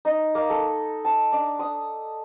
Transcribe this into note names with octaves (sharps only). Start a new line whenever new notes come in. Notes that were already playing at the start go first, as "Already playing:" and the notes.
D#4
A#3
A4
A5
D4
D#6